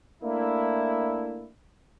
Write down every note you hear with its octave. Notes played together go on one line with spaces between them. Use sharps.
A3 A#3 D4 E4